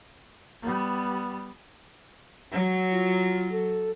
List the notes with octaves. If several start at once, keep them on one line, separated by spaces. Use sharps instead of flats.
G3 B3
F#3
F4
A4